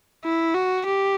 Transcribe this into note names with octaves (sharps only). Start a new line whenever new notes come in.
E4
F#4
G4